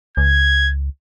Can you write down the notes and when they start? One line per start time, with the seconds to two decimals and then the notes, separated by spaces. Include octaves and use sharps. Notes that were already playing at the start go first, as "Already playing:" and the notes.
0.17 C#2 G#6